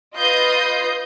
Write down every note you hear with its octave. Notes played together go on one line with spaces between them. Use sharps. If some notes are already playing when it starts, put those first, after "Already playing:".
F4 B4 D#5 D#6 G6 C7